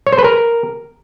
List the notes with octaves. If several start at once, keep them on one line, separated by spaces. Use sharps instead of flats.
C#5
C5
B4
A#4